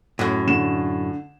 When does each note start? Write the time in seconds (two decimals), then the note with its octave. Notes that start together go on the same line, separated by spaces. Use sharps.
0.19 F#2 A2
0.47 D3 E7